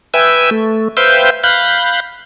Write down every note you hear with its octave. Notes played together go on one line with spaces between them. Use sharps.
B4 E5 G5 G#5 E6
A3
B4 C5 E5 F5 G5 G6
F5 B5 F#6 G6